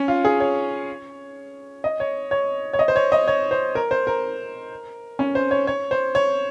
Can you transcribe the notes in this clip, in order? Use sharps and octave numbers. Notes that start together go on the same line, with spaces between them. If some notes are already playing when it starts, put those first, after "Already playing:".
Already playing: C#4
F4
G#4
C#5
D#5
C#5
C#5
C#5
D#5
C5
C#5
D#5
C#5
C5
A#4
C5
A#4
C#4
C5
C#5
C#5
C5
C#5